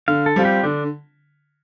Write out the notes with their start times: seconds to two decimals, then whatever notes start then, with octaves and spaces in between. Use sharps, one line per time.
0.08 D3 F5
0.26 A4
0.36 G3 C4 F4
0.45 G4
0.63 D3 D4